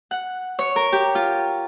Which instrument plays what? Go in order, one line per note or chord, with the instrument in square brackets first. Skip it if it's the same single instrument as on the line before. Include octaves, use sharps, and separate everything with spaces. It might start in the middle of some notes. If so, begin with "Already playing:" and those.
[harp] F#5
C#5
A#4
G4
F4